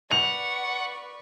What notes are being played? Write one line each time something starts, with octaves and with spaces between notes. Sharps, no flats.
B4 D5 F#5 C#6 F7